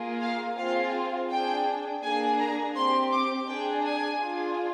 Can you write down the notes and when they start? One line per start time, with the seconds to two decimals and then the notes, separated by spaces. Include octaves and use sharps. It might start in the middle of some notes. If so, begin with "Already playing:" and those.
Already playing: A#3 F4 G#4
0.22 F5
0.57 C4 F4 G#4 F5
1.30 D4 G#4 G5
2.03 A#3 D4 G#4 G#5
2.39 A#5
2.75 C4 G4 C6
3.12 D6
3.48 D4 G#4 G5
3.85 G#5
4.20 D4 F4 G#4